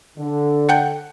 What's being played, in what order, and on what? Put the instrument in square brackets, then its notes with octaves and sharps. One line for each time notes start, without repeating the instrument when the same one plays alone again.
[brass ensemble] D3
[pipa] A4 F#5 G5